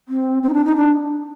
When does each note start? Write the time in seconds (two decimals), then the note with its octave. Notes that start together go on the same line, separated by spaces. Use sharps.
0.09 C4
0.43 C4
0.49 D#4
0.54 D4
0.65 D#4
0.76 D4